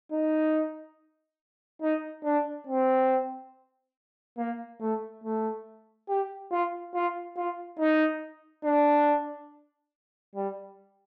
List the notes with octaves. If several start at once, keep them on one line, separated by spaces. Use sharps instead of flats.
D#4
D#4
D4
C4
A#3
A3
A3
G4
F4
F4
F4
D#4
D4
G3